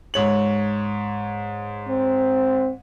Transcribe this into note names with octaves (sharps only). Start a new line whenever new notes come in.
G#2 C#5 F#7
C4